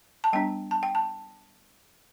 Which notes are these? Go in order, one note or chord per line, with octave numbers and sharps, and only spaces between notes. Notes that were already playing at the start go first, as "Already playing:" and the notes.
A5
G3 B3 D4 G5
A5
G5
A5